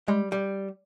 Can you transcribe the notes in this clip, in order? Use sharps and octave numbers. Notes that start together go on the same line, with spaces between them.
G3 G#3
G3